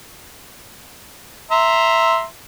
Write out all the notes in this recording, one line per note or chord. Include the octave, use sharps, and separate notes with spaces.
E5 A#5 C6